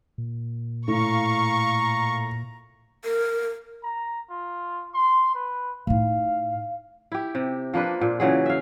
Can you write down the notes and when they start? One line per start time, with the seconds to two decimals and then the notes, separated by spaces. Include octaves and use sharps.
0.18 A#2
0.88 A2 F5 A#5 C#6
3.04 A#4
3.83 A#5
4.30 F4
4.94 C6
5.34 B4
5.87 A2 D#4 F5
7.12 E4 G4
7.35 C3
7.74 F3 A#3 D4 B4
8.01 A#2
8.20 C#3 E3 F#3 G#4
8.46 E5 F5